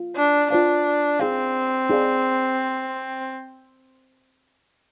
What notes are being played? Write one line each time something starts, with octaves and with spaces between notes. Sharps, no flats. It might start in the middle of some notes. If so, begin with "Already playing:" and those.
Already playing: F4 F5
D4
D4 F4 C5 F5
C4 D#4 G#4 D5 F5
D#4 G#4 D5 F5